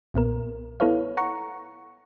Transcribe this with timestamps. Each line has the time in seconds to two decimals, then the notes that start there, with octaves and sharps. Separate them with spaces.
0.14 B1 A#2 B3 A#4
0.80 B3 E4 A4 B4 C#5 F5
1.17 F#5 A#5 C#6